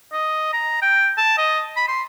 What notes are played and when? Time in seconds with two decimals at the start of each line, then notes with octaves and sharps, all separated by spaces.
0.13 D#5
0.53 A#5
0.82 G5
1.18 A5
1.38 D#5
1.76 B5
1.88 C6